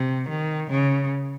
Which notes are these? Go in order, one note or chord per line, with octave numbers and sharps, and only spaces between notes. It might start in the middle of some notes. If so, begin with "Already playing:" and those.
Already playing: C3
D#3
C#3